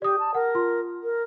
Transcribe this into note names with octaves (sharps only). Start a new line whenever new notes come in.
G4 D5 D#6
A5
A#4 F#5
F4 C6
A#4